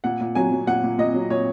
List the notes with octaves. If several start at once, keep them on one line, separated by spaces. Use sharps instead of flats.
A#2 F#5
A#2
F#3 G#5
F#3
A#2 F#5
A#2
A#2 D#5
F#3
A#2 C#5